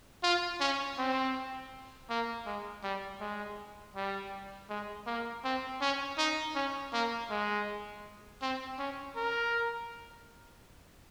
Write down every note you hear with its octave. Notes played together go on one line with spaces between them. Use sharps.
F4
C#4
C4
A#3
G#3
G3
G#3
G3
G#3
A#3
C4
C#4
D#4
C#4
A#3
G#3
C4
C#4
A#4